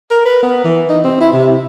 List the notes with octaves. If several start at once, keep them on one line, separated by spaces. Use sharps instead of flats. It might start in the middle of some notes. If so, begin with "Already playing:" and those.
A#4
B4
B3
E3
D#4
C4
E4
C3